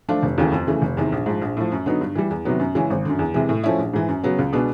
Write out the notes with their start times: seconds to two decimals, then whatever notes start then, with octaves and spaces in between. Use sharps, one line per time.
0.09 F3 A3 D4 F4
0.23 F1
0.38 D#2 C#3 E3 A3
0.52 F2
0.67 C#3 E3 A3
0.82 F1
0.97 E2 C3 D#3
1.12 A#1
1.26 G#2 F3
1.42 A#1
1.57 A2 F3
1.72 F#2
1.86 D3 F#3 B3 D#4
2.01 G2
2.16 E3 G3
2.31 E2
2.45 C3 D#3 F#3 B3
2.60 F#2
2.75 C#3 E3 G#3 C#4
2.90 G#1
3.05 F#2 D3
3.19 E2
3.34 C3 E3 G#3
3.49 A2
3.64 F3 A3 C#4 E4
3.79 A#1
3.93 G#2 E3
4.08 F#2
4.24 C#3 F#3 B3
4.38 C#2
4.53 B2 G#3 B3 D4